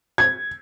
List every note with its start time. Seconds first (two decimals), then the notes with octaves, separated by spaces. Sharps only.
0.18 G#6